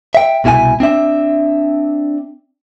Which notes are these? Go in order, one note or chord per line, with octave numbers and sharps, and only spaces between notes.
E5 G5
C2 B2 E4 F#4 G#5
C4 D4 E5